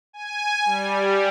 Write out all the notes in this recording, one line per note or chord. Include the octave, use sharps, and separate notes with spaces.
G#5
G3